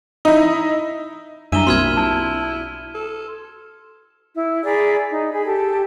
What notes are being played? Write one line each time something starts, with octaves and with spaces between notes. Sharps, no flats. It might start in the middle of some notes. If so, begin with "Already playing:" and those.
D#4 E4
F#2 G3 D4 E4 E5 D#7 E7 G7
B1 A#3 C4 F4 F#4 C6 F6 G#6
E4 A5
A4
E4
G#4 D5 A#5 B5
D#4
G#4 B5
G4 A4